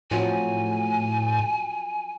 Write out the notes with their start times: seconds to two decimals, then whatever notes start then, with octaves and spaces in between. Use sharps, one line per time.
0.11 A2 F3 F#3 C4 G#5